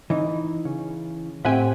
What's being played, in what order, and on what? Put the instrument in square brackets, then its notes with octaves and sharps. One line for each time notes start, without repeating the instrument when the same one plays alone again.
[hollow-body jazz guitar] E3 D#4
[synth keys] C#3
[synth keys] A2 C4 G4 [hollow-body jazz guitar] E5 F#5 G#5